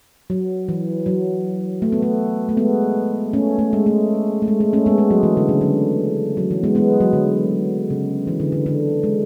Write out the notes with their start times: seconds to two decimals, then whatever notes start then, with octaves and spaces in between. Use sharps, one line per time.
0.30 F#3
0.69 E3
1.06 F#3
1.82 A3
1.92 B3
2.02 A3
2.49 A3
2.57 G#3 B3
3.33 A3 C#4
3.58 A3
3.73 G#3
3.86 A3
4.42 A3
4.48 G#3
4.60 A3
4.73 A3 C#4
4.86 G#3 B3
4.98 G#3
5.11 F#3
5.23 E3
5.37 D3
5.49 C#3
5.61 D3
6.37 F#3
6.51 E3
6.64 G#3 B3
6.75 G#3 B3
7.00 F#3
7.13 D3
7.90 C#3
8.27 E3
8.40 D3
8.52 D3
8.66 D3
9.03 G#3